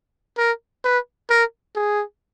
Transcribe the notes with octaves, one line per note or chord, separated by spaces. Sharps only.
A#4
B4
A#4
G#4